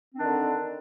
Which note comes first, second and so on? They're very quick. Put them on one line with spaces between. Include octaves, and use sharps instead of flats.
C4 D4 D#3 D3